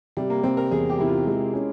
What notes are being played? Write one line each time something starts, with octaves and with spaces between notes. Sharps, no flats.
C3 G3
A#3
C3 C4
A#4
E2 G#4
G4
C3 E4
F4
G#3
C#4